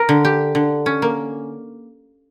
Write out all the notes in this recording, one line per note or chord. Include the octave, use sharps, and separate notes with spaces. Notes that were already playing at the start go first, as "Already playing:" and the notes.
Already playing: A#4
D3
G4
D3
C#4
A#3